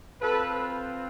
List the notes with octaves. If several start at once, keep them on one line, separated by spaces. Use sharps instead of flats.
C4 F4 A4 B4